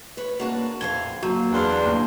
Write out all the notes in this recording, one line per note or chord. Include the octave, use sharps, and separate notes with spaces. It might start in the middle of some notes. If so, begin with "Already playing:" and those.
B4 C#5
A#3 D4 F#4 B4
F2 D3 F5 G#6 G7
F#1 F#3 A#3 F#4
E2 D4 F5 C6 F6
A#1 D#2 A2